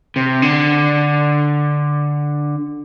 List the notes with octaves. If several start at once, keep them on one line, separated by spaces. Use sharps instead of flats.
C3
D3